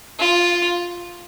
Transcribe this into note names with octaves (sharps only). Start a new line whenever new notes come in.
F4